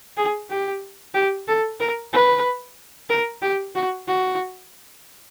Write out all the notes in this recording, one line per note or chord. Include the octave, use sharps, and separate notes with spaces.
G#4
G4
G4
A4
A#4
B4
A#4
G4
F#4
F#4